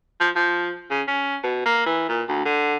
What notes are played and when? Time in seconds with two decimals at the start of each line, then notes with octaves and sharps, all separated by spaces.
0.20 F3
0.36 F3
0.90 C#3
1.08 C#4
1.44 B2
1.66 A#3
1.86 E3
2.09 A#2
2.28 D2
2.45 D3